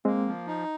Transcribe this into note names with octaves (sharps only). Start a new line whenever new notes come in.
G#3 A#3 C4
F3
D#4